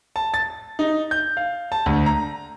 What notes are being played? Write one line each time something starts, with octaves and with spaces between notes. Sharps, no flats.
A5
A6
D#4
G6
F5
A5
D2
A#5